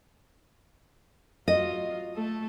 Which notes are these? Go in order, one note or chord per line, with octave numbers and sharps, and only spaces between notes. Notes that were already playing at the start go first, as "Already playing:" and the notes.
F#3 F4 D#5
A3 A4